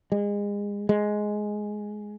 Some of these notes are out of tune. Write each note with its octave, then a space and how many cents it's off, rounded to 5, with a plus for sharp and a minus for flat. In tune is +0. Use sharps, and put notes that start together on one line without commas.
G#3 -30
G#3 +10